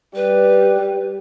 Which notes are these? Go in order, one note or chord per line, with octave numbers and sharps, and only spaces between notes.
G3 B4